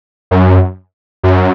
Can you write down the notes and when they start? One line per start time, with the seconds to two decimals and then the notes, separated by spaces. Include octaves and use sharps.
0.31 F#2
1.23 F#2